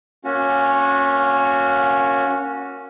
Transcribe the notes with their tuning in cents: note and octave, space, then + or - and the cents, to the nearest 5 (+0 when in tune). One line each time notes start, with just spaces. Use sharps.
A#3 +0 C#4 +0 F#4 -25